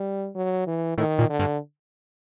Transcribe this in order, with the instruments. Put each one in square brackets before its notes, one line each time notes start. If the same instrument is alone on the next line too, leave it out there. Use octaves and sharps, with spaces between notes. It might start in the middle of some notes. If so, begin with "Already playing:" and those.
Already playing: [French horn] G3
F#3
E3
[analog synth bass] A2 [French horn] D#3
[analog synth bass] A#2
[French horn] D3
[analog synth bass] G2